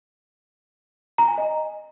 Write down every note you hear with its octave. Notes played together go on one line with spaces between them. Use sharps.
A#5
G#5
D#5